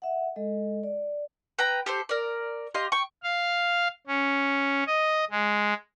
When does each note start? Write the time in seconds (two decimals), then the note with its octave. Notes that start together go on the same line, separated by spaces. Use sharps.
0.02 E5 F#5
0.36 G#3 A4 D#5
0.83 D5
1.59 B4 G5 A#5
1.86 G4 A4 C5
2.09 A#4 D5
2.74 G4 D#5 F5 C6
2.92 G5 C#6
3.23 F5
4.07 C#4
4.87 D#5
5.31 G#3